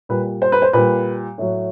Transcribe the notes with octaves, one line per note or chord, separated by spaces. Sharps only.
A#2 G3 B4
C5
B4
C5
A#2 G3 B4
A2 F#3